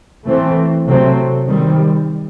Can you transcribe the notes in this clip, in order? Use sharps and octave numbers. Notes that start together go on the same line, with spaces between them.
E3 A3 C4
C3 F#3 A3 C4
D#3 G3 C4